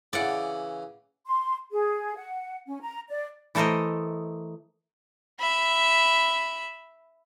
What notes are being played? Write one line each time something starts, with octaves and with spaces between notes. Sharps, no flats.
C#3 E3 D5 F#5
C6
G#4
F#5
C#4
A#5
D5
E3 A3 A4 A#4 C5 D#5
E5 B5